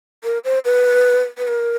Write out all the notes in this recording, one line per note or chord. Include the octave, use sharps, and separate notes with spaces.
A#4
C5
B4
B4
A#4